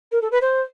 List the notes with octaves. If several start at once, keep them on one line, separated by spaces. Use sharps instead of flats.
A#4
A4
B4
C5